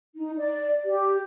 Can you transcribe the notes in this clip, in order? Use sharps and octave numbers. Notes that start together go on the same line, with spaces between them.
D#4
D5
G4